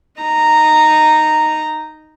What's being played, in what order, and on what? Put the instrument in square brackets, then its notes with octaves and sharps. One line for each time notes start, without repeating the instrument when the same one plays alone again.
[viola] D#4 A#5